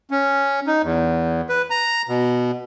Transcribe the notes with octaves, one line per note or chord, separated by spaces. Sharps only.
C#4
D#4
E2
B4
A#5
B2